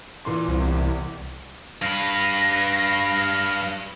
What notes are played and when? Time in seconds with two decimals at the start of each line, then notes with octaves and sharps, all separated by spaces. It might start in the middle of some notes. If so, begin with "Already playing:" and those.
0.25 A#2 E3 C6
0.48 C2
0.60 E2
1.82 G2 B4 F5 A#6